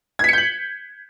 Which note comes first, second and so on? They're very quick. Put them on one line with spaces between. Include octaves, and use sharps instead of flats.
G#6 B6 C#7 G6 F#7